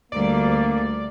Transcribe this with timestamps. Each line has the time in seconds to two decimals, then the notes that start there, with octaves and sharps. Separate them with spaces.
0.12 D2 G3 A#3 D5